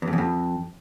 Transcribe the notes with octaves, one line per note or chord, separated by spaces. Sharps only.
E2
F2
E2
F2